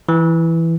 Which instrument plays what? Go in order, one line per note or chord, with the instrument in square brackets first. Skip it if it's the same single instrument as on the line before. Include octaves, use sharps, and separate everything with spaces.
[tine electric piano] E3